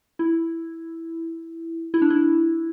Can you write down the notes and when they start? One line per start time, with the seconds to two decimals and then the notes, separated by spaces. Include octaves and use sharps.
0.19 E4
1.94 E4
2.02 D4
2.10 E4